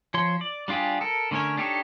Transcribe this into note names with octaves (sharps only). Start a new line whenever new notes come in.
F3 C#5 C6
D5
G3 D4 F4 G4 G#4
A4 A#4
D3 A3 C#4 A#4 C#5
D4 D#4 G4 A4 C#5